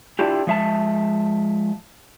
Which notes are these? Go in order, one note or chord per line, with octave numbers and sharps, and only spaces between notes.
D4 E4 F4 G4
F3 G#3 E5 F5 A5